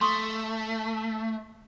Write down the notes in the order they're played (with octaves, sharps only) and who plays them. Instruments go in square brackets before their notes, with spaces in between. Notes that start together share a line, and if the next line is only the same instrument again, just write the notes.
[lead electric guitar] A3 [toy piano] C6 C#6 D#6